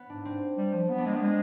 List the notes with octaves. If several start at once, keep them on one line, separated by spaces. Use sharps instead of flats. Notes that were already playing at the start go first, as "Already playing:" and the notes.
Already playing: B3
G#2 D4
C4
G3
F3
B3
D4
G#3 C4
B3
G#3